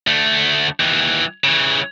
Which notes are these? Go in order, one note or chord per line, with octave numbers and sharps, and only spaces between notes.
D2 A3
D#2 E3
C#3 E3